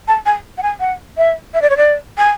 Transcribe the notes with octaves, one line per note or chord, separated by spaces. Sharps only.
A5
G#5
F#5
G#5
F#5
E5
E5
D5
C#5
D5
G#5